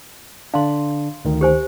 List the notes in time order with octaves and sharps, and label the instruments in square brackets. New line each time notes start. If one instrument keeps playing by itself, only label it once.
[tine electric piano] D3 D4 [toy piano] F5 C6
[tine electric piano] D2 D#3
[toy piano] G4 C5 G#5